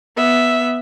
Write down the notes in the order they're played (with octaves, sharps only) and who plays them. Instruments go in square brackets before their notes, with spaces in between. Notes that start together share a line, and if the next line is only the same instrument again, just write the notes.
[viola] B3 E5